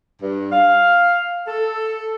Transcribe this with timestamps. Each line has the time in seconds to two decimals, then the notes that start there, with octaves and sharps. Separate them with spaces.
0.21 G2
0.51 F5
1.47 A4